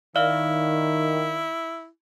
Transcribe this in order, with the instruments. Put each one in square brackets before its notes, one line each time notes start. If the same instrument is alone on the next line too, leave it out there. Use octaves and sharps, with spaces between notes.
[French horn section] D#3 [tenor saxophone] E4 [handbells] D5 F5 F6